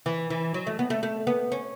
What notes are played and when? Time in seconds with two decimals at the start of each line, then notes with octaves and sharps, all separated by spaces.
0.06 E3
0.30 E3
0.54 F#3
0.67 A3
0.79 B3
0.90 A3
1.03 A3
1.27 B3
1.52 C#4